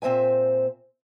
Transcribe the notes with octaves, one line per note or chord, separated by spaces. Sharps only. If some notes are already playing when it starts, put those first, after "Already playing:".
A#2 C4 C5 E5 G#5